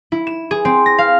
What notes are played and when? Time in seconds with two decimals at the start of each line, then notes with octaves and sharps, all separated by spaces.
0.12 E4
0.27 E7
0.51 G#4
0.65 C4
0.86 A#6
0.98 F5